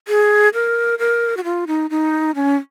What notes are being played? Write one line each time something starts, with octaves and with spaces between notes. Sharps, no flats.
G#4
A#4
A#4
F#4
F4
D#4
D#4
C#4